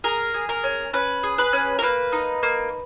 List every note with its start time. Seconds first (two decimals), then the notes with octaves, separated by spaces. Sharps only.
0.04 G#4 A#4
0.34 G#4
0.49 A#4
0.64 C#4
0.93 C#4 B4
1.23 G#4
1.38 B4
1.53 C#4
1.79 A#4
1.82 A#3 B4
2.12 D#4
2.43 A#3